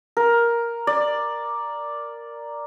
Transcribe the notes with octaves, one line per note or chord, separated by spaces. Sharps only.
A#4
D5